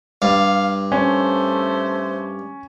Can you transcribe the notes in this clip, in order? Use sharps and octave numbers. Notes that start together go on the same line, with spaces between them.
G2 F5
A3 C#4 C5